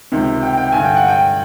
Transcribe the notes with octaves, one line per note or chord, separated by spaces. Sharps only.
C#2 C3 D#3
G5
G5
G2 D3 G#5
G5
F#5
G5